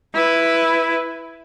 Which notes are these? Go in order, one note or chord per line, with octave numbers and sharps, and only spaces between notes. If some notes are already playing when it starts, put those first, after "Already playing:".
E4 B4